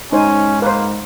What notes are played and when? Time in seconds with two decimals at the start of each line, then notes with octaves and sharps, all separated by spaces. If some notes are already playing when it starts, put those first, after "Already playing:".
0.12 G#2 C#4 D#4 C5 G#5
0.62 A#3 B4 C5